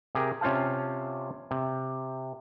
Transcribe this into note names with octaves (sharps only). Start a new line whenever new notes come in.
C3 G4 G#4 A#4
C3 C#4 F4 C5 F5 A5
C3